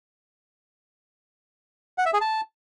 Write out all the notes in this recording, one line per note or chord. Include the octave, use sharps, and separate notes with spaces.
F#5
E5
G#4
A5